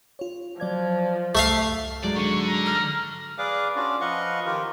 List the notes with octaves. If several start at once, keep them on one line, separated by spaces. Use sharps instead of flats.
F4 C#5
F3 F#3 D5 G#6
C2 A3 E5 F5
G#2 F#3 G#3 D5
D3 C#6
A#5
F6
G#4 B4 D5 F5 D6
C#4 D4 F4 F#4 D5
F3 B4 D#5 F5 F#5 C#6
D#3 F3 F4 G4 A#4